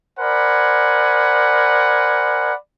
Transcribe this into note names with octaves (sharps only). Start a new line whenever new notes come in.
A#4 C5 D5 F#5 G#5 B5